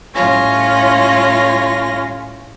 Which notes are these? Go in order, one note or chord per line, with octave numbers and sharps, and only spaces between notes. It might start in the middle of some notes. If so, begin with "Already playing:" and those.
A2 G3 C#4 F4 A#6